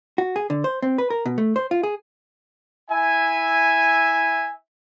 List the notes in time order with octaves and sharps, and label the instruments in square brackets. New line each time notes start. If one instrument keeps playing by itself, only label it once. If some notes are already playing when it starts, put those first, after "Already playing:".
[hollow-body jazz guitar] F#4
G#4
D3
C5
C4
B4
A#4
B2
A3
C5
F4
G#4
[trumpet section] E4 E5 G#5